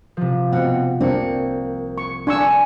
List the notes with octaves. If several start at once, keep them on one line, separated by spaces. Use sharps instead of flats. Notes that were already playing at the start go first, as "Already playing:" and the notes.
C3 F3
B2 C4 F#5
C2 A#3 C4 D4 C#7
C#6
D4 G#5 C#6 E6